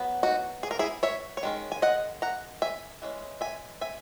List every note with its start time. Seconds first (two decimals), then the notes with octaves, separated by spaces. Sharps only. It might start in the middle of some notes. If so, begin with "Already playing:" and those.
Already playing: F#3 B3
0.23 D#4 F#4
0.63 G#4
0.71 A#4
0.79 E4 G#4
1.03 C#5 E5
1.37 C#5
1.43 D#3 G#3 C#4
1.72 G#5
1.82 D#5 F#5
2.22 F#5 A#5
2.62 E5 G#5
3.02 E3 G#3 C#4
3.41 E5 G#5
3.81 E5 G#5